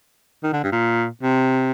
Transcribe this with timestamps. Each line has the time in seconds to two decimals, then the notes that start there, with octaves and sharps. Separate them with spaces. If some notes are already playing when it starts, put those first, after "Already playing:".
0.44 D#3
0.53 D3
0.63 G2
0.72 A#2
1.22 C3